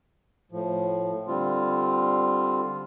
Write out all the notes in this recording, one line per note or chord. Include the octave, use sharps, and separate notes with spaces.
A2 F3
D3 G3 C4 F4